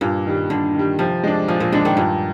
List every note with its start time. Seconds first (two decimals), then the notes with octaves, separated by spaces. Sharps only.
0.01 G2 A#2
0.26 D#3 G3
0.50 G2 D3
0.75 D#3 G3
0.99 C3 F3
1.24 G#3 D4
1.48 A#2 F3
1.60 A#2
1.72 D3 G#3 D4
1.85 D#3
1.97 G2 A#2